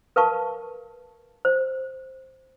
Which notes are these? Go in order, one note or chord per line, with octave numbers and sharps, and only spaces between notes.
A#4 B4 F5 A5 C#6
C5